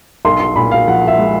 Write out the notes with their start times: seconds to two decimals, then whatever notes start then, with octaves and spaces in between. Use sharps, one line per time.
0.25 B1 C6
0.40 C6
0.56 A#2 B5
0.71 F5
0.87 F3 F#5
1.08 E5
1.19 G#3